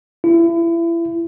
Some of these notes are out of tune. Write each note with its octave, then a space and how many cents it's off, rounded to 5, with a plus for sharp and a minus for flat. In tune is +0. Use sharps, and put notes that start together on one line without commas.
E4 +30